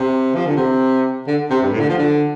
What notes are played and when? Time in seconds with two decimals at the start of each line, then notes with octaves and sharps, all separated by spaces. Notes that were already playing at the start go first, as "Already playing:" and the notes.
Already playing: C3
0.35 F3
0.46 D3
0.56 C3
1.27 D3
1.50 C3
1.62 G2
1.72 A2
1.80 D3
1.89 F3
1.98 D3